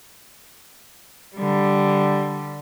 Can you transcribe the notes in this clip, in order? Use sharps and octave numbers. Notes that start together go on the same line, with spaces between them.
D3 G3